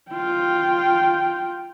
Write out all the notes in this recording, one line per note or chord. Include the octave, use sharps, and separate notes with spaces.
F4 G5